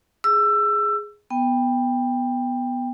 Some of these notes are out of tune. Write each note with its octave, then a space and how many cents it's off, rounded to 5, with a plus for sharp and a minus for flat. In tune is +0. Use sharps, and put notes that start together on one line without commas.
G#4 +0 E6 +20
B3 +0 G5 +15